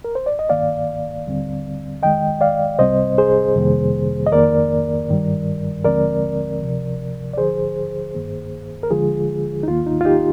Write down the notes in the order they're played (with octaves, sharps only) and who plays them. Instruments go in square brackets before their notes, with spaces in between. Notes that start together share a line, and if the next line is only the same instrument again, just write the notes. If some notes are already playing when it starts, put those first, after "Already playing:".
[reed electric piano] A#4
C5
D5
D#5
G2 D#3 A#3 D5 F5
D#2 D3 G3 C4
F2 D#3 G#3 D#5 G5
D5 F5
C2 C3 G3 C4 C5 D#5
G#4 C5
F2 C3 D#3 G3 A#3
D#5
F2 D#3 A#3 A#4 D5
G2 D#3 G3
D#2 D3 F3 G#3 C4 A#4 D5
D2 C3 F3
D5
D#2 D3 F3 G#4 C5
G2 D#3 A#3
A#4
D#2 D3 F3 G#3 F4 G#4
D#4
D#2 D#3 A#3 F4
D#4
F4
D#4 G4